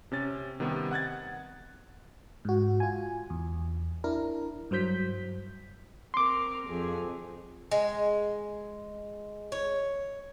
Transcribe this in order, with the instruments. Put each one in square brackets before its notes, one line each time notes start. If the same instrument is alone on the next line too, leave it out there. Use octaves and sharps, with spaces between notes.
[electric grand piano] C3 C#4 A6
C3 D#3 G3 B3
F#5 F#6 G#6 A6
[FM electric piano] G#2 F#4
F4 G#5
E2
D4 E4 A#4
G2 F#3 C5 G6 B6
[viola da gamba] C4 A#4 [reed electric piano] C6 D6
[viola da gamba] F2 G#4
[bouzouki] G#3
C#5